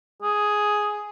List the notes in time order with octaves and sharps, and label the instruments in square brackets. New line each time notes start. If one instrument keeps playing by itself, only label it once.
[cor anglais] G#4